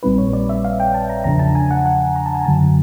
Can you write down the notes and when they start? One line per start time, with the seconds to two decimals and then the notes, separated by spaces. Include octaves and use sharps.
0.03 A#1 A#2 G3 C4 D#4 B4
0.18 C#5
0.33 D5
0.49 E5
0.65 F5
0.80 G5
0.94 A5
1.10 A#5
1.24 E2 C#3 F3 A3 D4 A#5
1.39 A5
1.55 G#5
1.71 F#5
1.86 F#5
2.16 A#5
2.26 A5
2.35 G#5
2.45 F#2 D3 F#3 A5